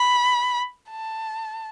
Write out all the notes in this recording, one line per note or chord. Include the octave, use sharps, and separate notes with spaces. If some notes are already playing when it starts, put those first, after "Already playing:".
Already playing: B5
A5